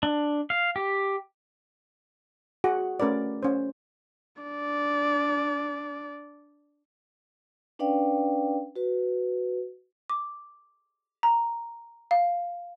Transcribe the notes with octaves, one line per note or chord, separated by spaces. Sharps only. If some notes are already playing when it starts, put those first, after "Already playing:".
D4
F5
G4
F#4 G#4 F#5
A3 C#4 A#4 B4 D5
C#4 C5
D4 D5
C#4 D4 B4 D5 F5 G5
F#4 B4
D6
A#5
F5